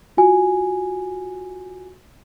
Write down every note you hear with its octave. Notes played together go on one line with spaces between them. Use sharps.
F4 F#4 G#5